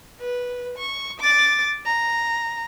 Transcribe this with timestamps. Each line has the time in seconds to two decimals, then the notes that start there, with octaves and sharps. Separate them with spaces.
0.21 B4
0.78 C#6
1.20 D6 A6
1.86 A#5